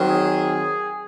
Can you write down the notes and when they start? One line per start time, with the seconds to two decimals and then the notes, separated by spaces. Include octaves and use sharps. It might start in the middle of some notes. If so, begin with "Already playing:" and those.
Already playing: D#3 F#3 C4
0.10 G#4